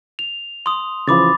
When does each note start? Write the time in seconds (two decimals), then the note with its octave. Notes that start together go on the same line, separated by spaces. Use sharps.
0.19 F7
0.66 C6 D#6
1.08 C#3 E3 F3 B5 D6 A6